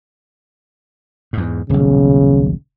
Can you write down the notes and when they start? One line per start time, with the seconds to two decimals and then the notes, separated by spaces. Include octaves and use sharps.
1.33 E2 G#2
1.70 D#1 B1 C#3